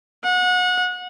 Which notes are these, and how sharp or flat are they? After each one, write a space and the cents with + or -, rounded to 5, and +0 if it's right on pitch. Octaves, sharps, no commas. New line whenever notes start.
F#5 -30